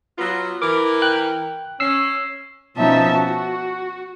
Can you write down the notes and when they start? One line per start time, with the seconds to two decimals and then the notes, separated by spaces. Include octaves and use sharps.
0.18 F#3 B3 F4
0.62 E3 A#4 D6
1.02 G5 F#6
1.80 C#4 E6 C7
2.77 B2 F3 C#4 D#4 E5 A5
3.12 F#4